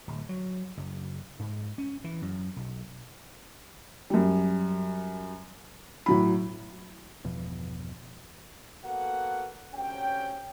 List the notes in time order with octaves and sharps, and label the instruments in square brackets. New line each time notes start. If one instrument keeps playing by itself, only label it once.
[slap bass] D1
F#3
F#1
G#2
C#4
E3
F#2
B1
[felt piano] F#2 G3
A2 F#3 B5
[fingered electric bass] G1 E2 B2 F3
[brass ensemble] A#3 B3 F#4 A4 F#5
D2 C3 C#4 C#5 G5